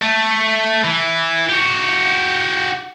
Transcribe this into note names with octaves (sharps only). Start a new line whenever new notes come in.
A3
E3
F#4 G4